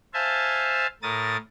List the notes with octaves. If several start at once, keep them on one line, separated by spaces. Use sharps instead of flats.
C5 E5 F5 G#5 A5
A2 A#4 D#6 A6